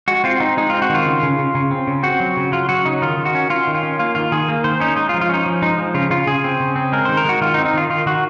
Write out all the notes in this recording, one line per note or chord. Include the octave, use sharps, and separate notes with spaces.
G#3 F#4
C4 F4
C4 D#4
G#3 D#4
C4 F4
F#4
D#3 F4
C#3
C#3
C#3
C#3
C4
C#3
C4 F#4
F#3
C#3
F#3 F4
F#3 F#4
C#3 D#4
D#3 F4
D#3
F#4
C#4
C#4 F4
D#3
F4
C#4
A#3 F4
D#3 F4
D#3 G#4
A#3
D#3 C5
C#4 D#4
G#3 D#4
F4
F3
F4
C#4 D#4
F3
G#3 D#4
F3
C#3 F4
C#3 F4
C#3 G#4
C4
C#3
C4
G#3 A#4
D#3 C5
A#4
G#3 F#4
D#3 F4
D#4
C4
D#4
D#3 F4
D#3 F4
D#3 F#4